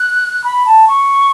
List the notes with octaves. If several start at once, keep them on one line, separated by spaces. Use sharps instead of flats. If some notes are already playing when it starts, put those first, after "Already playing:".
Already playing: F#6
B5
A5
C#6